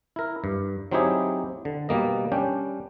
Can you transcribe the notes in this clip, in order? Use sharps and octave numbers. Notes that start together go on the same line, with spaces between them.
E4 A#4
G2
F#3 C4 D#4 E4 G4 G#4
D3
B2 G3 A#3 D#5
G3 C#4 D4 G5